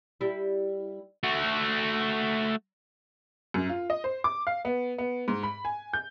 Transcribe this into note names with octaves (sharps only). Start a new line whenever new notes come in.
G3 E4
A3 F#4
F#2
F4
D#5
C5
D6
F5
B3
B3
G#2
B5
G#5
G6